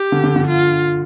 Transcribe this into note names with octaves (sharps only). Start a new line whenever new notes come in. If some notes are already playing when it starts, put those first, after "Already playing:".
Already playing: G4
D3
D3
D3
F4